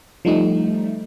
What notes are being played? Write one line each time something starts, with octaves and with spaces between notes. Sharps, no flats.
F3 G3 A3 D#4